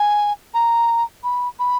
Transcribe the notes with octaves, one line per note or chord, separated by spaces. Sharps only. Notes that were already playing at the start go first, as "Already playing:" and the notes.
Already playing: G#5
A#5
B5
B5